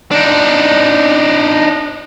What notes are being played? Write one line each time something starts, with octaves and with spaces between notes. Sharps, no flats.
D4 D#4